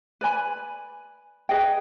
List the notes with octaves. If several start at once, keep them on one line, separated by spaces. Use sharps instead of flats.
B4 D5 G#5 B5
G#4 B4 D#5 G5